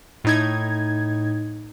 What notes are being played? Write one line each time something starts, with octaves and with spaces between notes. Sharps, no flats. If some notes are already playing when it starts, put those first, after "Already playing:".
A2 D#4 G#6